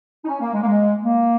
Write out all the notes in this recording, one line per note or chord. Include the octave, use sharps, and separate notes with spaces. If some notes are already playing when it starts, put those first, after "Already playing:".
D#4
C#4
A#3
G#3
A#3
G#3
A#3